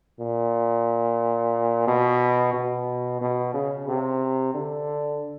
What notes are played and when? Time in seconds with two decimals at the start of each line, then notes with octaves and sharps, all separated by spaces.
0.19 A#2
1.87 B2
2.53 B2
3.21 B2
3.54 C#3
3.88 C3
4.54 D3